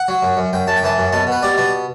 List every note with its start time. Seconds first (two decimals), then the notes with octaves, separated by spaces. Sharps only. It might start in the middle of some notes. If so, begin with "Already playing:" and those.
Already playing: F#5
0.08 F#3
0.22 F#2
0.37 F#2
0.53 F#2 G5
0.67 F#2 A5
0.77 G5
0.83 E3 A5
0.98 F#2
1.13 B2 A5
1.27 B2 B4
1.43 G3 D5
1.57 B2 D5